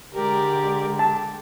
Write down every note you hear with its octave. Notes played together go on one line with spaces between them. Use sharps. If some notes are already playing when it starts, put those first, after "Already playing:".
D3 G#3 G4 A#4 D5
G4 A5